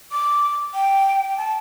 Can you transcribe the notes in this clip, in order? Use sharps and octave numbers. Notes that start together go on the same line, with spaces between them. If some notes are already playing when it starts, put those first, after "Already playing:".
D6
G5
A5